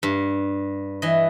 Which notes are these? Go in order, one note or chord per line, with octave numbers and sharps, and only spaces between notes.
G2
E3 D#5